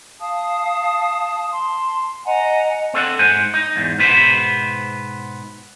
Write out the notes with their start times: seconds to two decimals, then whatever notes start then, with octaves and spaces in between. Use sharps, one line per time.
0.21 F5 A5 D#6
1.52 A5 C6
2.26 D#5 F#5 G#5 A#5
2.94 C4 A4 F5 F#5
3.19 G#2 C5 F#5 G#5
3.54 D#4
3.76 E2 G#2
3.98 G#2 B2 B3 B4 C5